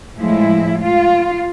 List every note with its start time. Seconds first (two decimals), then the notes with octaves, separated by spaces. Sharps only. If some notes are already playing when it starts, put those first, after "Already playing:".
0.18 A2 F3 G#3 E4
0.80 F4